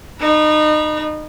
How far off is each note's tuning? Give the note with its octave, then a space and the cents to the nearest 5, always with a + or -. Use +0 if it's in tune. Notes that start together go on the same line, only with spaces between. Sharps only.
D#4 -30 B5 -35